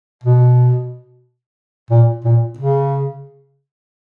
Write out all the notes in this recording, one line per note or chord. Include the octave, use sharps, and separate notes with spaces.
B2
A#2
A#2
C#3